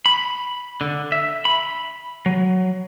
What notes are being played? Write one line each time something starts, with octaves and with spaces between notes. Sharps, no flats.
B5
D3
E5
B5
F#3